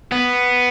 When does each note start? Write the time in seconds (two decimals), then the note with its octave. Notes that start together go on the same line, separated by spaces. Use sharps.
0.12 B3